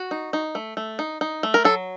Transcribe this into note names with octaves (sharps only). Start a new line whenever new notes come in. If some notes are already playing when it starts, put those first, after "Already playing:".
Already playing: F#4
D#4
D#4
A3
A3
D#4
D#4
A3
A#4
F#3 A4